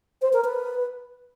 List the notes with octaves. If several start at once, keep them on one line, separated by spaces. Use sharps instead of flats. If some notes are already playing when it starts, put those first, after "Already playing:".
C5
A#4
B4